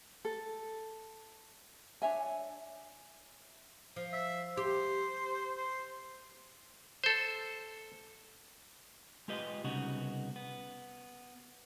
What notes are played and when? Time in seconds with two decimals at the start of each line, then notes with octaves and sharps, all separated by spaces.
0.25 A4
2.02 D4 C#5 E5 G#5
3.96 F3
4.13 E5
4.57 G4 C5
5.57 C5
7.04 A4 C5
9.28 G#3 F4 G4 B4 D#5
9.64 C2 C#3 B3 D#4 F#4
10.36 B3